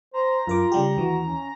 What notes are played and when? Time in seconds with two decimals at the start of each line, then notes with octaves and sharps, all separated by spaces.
0.14 C5 A#5
0.47 F#2 F4 A#4 D6
0.72 C#3 G3 G4
0.97 D#2 E3 F#4
1.25 C#4